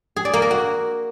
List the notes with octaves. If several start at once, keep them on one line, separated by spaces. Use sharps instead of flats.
G#4
D5
A#3
A#4
F#4